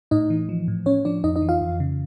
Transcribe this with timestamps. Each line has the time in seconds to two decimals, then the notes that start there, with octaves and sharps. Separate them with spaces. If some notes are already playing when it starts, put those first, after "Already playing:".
0.11 A2 D#4 D#5
0.30 E3
0.49 F3
0.68 A2
0.86 A2 C#4 C#5
1.05 F3 D4 D5
1.24 F2 D#4 D#5
1.36 D#4 D#5
1.42 E3
1.49 F4 F5
1.61 F2
1.80 C#3